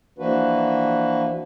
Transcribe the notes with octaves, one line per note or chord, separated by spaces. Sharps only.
E3 F3 A#3 D4 F#4 B4